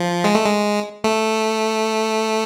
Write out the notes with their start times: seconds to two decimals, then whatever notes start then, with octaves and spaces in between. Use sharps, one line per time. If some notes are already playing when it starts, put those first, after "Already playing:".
Already playing: F3
0.24 G#3
0.35 A3
0.46 G#3
1.04 A3